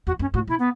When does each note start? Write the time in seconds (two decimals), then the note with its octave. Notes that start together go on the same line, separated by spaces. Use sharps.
0.07 E2 F#4
0.19 F#2 C#4
0.34 A2 F#4
0.48 B2 E4
0.59 B3